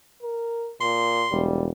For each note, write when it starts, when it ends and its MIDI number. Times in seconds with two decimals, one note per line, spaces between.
0.22 0.72 70
0.81 1.25 46
0.81 1.42 84
1.31 1.70 28
1.31 1.67 55